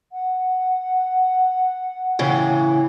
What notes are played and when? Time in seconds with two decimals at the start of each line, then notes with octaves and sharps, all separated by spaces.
0.12 F#5
2.19 A2 C#3 E3